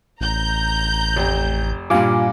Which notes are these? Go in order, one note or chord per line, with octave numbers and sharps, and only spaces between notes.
A1 A#5 G6
F1
G2 A#2 F4 F5 G#5 D6